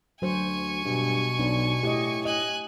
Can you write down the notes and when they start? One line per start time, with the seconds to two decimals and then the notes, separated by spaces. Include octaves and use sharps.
0.22 D2 F#3 C5 G#5 C#6
0.84 G2 B2
1.39 B1 D4
1.83 A2 G4 D#5
2.25 D#5 G#5 F#6